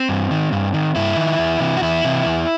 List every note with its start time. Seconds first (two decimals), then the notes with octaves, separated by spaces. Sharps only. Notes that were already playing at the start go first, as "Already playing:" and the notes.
Already playing: C4
0.09 G2
0.31 D#3
0.52 G2
0.74 D#3
0.96 G2 E4
1.17 D#3
1.39 E2
1.60 C3 E3
1.77 F#4
1.82 E2 E4
2.04 C3 E3
2.26 E2